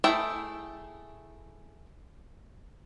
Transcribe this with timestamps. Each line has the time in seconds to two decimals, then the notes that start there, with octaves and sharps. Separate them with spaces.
0.04 A3 E4 G#4 E5 G5